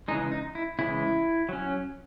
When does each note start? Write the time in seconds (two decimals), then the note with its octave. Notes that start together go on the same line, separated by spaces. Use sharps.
0.08 C#3 E3 G#3 D#4
0.32 D#4
0.55 E4
0.79 C#3 E3 G#3 E4
1.49 F#3 C#4